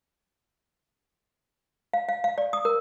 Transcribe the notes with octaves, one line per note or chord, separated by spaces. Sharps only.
F5
F5
F5
D5
D#6
A#4